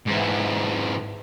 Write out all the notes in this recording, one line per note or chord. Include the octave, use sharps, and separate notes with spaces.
G#2 E3